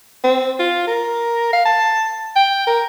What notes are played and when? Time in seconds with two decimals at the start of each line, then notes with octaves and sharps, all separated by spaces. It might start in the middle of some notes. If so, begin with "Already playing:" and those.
0.24 C4
0.59 F4
0.87 A#4
1.53 F5
1.65 A5
2.36 G5
2.67 A#4